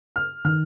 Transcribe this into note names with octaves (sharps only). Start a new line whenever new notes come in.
F6
D#3 F6